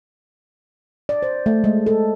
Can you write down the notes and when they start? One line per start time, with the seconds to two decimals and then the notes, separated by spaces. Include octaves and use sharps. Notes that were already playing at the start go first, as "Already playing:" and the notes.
1.09 D5
1.23 C5
1.46 A3
1.64 G#3
1.86 A4